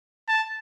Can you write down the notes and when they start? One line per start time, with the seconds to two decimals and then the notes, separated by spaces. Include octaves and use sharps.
0.28 A5